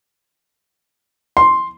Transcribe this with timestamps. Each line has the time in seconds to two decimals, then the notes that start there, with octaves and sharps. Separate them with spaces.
1.37 C6